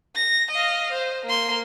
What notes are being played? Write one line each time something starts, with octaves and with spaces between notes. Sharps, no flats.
A#6
D#5 F5
C5
A#3 C6